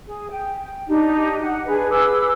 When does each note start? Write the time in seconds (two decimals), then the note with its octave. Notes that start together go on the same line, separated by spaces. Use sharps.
0.07 G#4
0.31 G5
0.88 D4 D#4 G4
1.42 F#5
1.66 D4 G#4 B4
1.89 G#4 B4 D6 E6